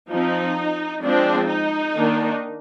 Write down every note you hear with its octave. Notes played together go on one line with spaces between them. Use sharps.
F3 C4 D#4
F3 G#3 C4 D4
D#4
D#3 A#3 D4